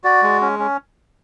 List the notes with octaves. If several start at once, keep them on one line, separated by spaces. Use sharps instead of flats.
F#4 D5
G#3
C#4
C#4